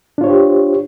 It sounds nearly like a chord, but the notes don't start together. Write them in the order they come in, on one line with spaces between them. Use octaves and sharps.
D4 F4 C#5 C5 G4